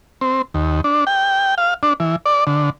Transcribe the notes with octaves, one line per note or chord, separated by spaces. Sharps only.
C4
D#2
D4
G5
F5
D4
E3
D5
D3